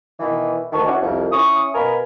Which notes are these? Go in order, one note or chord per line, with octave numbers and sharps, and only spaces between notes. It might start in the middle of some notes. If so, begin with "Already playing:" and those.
B2 D#3 E3
D2 D#3 A5 C#6
C#4 E4 F#4 D5 G#5
C2 F2
C#4 E4 C#6 D#6
B2 A#4 F5 G#5 B5